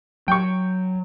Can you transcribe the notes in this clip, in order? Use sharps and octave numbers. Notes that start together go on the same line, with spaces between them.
F#3 G5 C#6